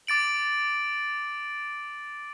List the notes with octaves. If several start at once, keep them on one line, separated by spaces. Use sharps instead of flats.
D6 A6 D7 F#7